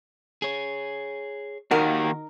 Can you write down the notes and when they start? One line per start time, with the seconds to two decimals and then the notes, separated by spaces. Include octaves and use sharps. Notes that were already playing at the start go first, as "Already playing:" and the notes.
0.42 G#4 C#5
1.71 D#2 D#3 D#4 F#4 A#4